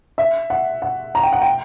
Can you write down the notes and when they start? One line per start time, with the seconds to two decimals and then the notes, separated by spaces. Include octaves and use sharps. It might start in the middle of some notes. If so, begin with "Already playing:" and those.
0.18 E5
0.50 F#5
0.82 F#5
1.15 A#5
1.23 G5
1.33 F#5
1.42 G5